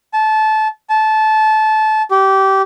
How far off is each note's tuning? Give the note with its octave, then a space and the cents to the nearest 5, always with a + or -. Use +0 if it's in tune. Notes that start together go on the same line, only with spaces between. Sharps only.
A5 -20
A5 -20
G4 -20